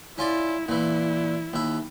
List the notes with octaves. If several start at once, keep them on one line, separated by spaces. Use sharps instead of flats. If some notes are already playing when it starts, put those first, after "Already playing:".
C#4 E4 F4 D5
A#2 E3 E4
D#2 E4